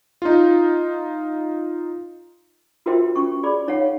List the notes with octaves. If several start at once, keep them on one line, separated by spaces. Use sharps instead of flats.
D#4 F4
F4 F#4 A#4 C5 E5 G5
C#4 C#6
G#4 D5 B5
D#4 C#5 F5 F#5